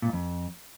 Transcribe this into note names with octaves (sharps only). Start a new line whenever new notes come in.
A#2
G#2
F2